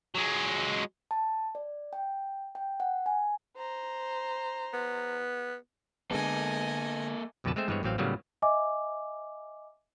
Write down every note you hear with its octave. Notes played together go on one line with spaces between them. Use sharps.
F#3 G#3
A5
D5
G5
G5
F#5
G#5
C5 A#5
B3
D3 G#3 A#3 B3 A4 D#5 G#5
B1 F2 B2 D3 B4 A5
G#3 A3 C4 C5 E5
G2 E3 G#3 B3 C4 C#5
A1 E3 F#3 C4 F5 G5
A2 C#3 F#3 G3 A#3 B3
D#5 E5 G#5 D6